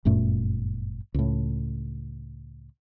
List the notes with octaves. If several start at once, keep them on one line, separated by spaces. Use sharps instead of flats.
G1 F#2 A#2 A3
C#2 A2